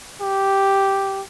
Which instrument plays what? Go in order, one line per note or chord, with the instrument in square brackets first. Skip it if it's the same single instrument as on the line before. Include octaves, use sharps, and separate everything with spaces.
[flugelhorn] G4